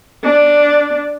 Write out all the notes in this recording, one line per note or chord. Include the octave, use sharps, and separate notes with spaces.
D4